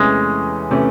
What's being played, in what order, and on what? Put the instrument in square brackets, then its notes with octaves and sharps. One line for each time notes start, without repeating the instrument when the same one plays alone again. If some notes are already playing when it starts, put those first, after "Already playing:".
Already playing: [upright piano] E2 C3 E3 A3 C#4 [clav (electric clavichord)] G#3
[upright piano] C3 E3 A3 C#4